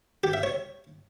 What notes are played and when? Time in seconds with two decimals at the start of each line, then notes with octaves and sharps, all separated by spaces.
0.24 G4
0.33 E5
0.43 C#5